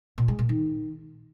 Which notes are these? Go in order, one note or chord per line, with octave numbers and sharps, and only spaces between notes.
A#2
G#3
A#2
D#3